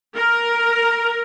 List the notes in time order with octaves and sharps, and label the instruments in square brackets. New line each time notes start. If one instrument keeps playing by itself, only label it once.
[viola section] A#4